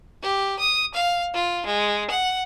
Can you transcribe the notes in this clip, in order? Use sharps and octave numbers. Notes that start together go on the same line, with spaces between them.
G4
D#6
F5
F4
G#3
F#5